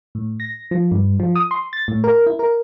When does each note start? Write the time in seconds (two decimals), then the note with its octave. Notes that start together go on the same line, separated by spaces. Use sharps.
0.15 A2
0.40 A#6
0.71 F3
0.92 G2
1.20 F3
1.36 D#6
1.51 C6
1.73 A6
1.88 A2
2.04 A#4
2.26 E4
2.39 A#4